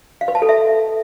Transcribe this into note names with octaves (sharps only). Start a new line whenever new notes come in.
F5
B4
A5
A4
E5